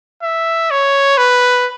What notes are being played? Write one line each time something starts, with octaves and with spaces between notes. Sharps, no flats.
E5
C#5
B4